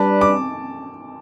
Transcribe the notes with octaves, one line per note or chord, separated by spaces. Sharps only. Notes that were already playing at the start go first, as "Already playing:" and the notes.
Already playing: G3 D4 B4 D5 A5
D6